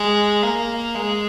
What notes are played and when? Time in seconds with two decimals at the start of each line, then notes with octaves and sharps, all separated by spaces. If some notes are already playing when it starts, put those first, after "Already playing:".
Already playing: G#3
0.43 A#3
0.95 G#3